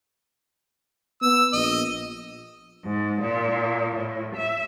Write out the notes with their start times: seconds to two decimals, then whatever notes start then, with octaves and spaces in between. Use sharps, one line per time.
1.22 B3 E6
1.53 A#1 D#5
2.85 G#2
3.23 A#2
3.96 A2
4.36 E5